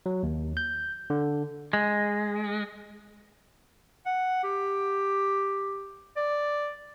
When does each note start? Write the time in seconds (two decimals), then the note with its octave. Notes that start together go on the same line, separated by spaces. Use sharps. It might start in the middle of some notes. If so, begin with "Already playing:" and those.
0.06 F#3
0.23 D#2
0.57 G6
1.10 D3
1.73 G#3
4.06 F#5
4.44 G4
6.16 D5